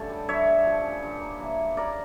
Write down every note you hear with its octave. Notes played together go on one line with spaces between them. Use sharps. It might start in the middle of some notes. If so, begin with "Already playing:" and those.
Already playing: G2 D3 A3 C#4 A4 C#5
G3
G2 C#5 E5
G2
F3
C#4
G2
A#3
E3
G3
C#3 A#4 D5